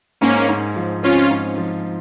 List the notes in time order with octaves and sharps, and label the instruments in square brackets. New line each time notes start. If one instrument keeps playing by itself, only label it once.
[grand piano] G#2 [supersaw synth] A#3 C#4
[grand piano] G#2
F3
[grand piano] C4 [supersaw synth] C#4 F4
[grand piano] G#2
F3